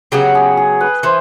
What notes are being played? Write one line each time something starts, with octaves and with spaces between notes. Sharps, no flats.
C#3 F#3 B3 G4
G#4
G#4
B4
E3 C5